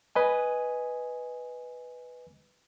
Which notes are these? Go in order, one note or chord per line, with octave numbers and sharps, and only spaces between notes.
B4 D#5 G#5